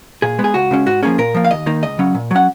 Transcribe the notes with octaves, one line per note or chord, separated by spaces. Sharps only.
A#2 G#4
G#3 B3
G#4
C#2 F#4
C#3 G#3 C#4
G#2 F#4
F3 A#3 C#4 G#4
A#2 A#4
F3 A#3
F5
D#2 D#5
D#3 A#3 D#4
C#2 D#5
C#3 F#3 C#4
A#2
F#3 C#4 F#5